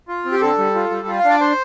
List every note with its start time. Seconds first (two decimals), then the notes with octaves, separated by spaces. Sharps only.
0.08 F4
0.25 C4
0.32 G4
0.41 D3 A4
0.58 G3
0.75 F4
0.91 G3
1.07 F4
1.19 F5
1.24 D4
1.30 D5
1.41 C5